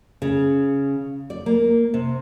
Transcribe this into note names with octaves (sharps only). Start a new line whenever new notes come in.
C#3
D5
A#3
C3